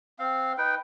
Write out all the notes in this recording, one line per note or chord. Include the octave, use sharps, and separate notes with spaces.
C4 F5
D#4 B4 G5